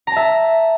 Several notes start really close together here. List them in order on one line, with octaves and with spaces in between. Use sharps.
A#5 A5 E5